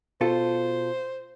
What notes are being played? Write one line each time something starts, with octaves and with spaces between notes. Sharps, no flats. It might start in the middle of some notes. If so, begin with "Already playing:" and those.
B2 F4 A4 C5